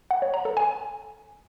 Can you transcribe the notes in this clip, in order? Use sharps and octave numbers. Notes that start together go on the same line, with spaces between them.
F#5
C#5
A#5
A4
G#5